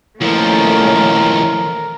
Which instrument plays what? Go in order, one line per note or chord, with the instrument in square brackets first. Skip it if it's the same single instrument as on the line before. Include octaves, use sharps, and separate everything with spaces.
[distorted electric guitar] D#2 F3 [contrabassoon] E3 [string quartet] A3 A#3 C#4 [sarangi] A#4